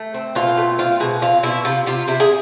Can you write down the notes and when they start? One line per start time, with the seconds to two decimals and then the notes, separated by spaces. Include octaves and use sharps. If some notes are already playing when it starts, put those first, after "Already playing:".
Already playing: A3
0.14 C4
0.35 B2 F4
0.57 A3
0.79 C4 F4
1.00 B2 G#4
1.22 C4 F4
1.43 B2 E4
1.65 C3 F4
1.86 C3 F4
2.08 C3 E4
2.20 G#4